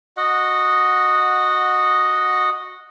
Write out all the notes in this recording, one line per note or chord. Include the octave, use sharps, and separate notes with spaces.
F#4 D#5 F#5